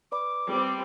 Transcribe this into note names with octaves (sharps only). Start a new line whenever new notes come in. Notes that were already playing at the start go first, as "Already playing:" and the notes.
B4 D5 B5 D6
G3 C4